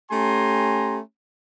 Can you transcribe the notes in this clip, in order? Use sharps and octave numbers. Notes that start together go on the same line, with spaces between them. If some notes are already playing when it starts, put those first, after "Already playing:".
A3 C#4 G4 G#5 A#5 C6